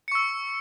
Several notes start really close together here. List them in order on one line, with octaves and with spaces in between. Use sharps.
C#7 C#6 E6